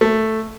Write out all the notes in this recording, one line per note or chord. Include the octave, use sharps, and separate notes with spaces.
A3